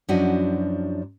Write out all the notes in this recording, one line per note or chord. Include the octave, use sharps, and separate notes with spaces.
F#2 F3 D4 E4 F#4 D#5